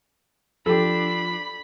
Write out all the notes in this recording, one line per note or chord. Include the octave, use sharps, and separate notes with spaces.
F3 D4 G4 A4 B5